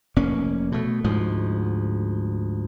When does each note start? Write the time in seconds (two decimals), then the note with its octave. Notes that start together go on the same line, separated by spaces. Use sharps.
0.16 F1 A#3 C#4
0.72 B2 A3
1.04 D2 G#2 F3